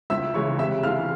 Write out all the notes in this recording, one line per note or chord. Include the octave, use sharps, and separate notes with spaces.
C#2 E5 E6
C#3 E3 G#3 E4 C#5 C#6
C3 E5 E6
E3 G#3 F5 F6